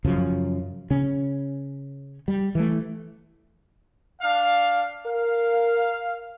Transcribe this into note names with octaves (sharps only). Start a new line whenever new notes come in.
F#2 C#3 F3
C#3 C#4
G3
E3 A3
D4 F5
A#4 F5